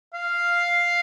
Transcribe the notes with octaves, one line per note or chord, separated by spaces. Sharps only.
F5